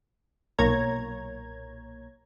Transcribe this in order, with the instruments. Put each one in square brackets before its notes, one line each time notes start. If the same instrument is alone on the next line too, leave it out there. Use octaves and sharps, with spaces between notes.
[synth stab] B1 A#2 A#3 C#5 A#5 G#6